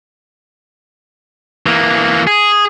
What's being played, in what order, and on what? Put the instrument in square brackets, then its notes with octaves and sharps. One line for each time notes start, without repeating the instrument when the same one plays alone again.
[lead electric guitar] E3 A#3
G#4